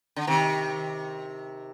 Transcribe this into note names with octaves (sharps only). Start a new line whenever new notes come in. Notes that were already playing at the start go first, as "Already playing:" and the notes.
D3
C3 D#3